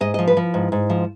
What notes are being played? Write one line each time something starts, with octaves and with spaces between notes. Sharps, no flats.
G#2 D#5
D#5
F3
B4
F3
G#2
G#2
F3